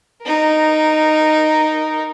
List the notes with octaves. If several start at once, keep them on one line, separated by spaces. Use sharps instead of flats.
D#4 A#4